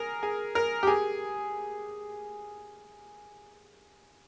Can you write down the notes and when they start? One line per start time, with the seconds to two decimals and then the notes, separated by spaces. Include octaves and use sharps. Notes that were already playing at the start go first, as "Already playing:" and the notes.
Already playing: G#4 A#4
0.23 G#4
0.55 A#4
0.83 G4
0.87 G#4